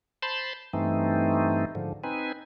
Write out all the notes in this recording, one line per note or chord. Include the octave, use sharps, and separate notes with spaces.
C5 A5 B5 C6
G2 E3 A3 C4 D#4
G#2 D3 F3
C4 D#4 B4 G#5